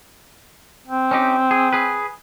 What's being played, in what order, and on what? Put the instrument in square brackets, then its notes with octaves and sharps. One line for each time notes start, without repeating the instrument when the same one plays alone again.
[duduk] C4
[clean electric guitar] C#4 D#4 G4
G#4
G#4 B4